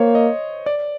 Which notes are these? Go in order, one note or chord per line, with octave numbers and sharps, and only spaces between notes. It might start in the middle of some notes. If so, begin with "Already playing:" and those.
Already playing: A#3 C5 C#5
D#5
D5